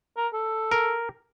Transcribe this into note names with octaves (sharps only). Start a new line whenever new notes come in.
A#4
A4
A#4